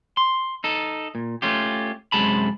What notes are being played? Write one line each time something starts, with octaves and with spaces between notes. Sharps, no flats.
C6
D#4 A4
A#2
A3 C#4 F4 G4
F#2 C3 G#3 A5 B5